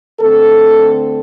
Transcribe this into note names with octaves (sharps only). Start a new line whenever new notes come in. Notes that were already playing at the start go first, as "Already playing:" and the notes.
D3 A3 C4 A4